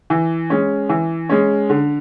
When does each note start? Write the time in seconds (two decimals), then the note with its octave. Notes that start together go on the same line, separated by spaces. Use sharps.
0.10 E3
0.50 G#3 C#4
0.89 E3
1.29 G#3 C#4
1.70 D3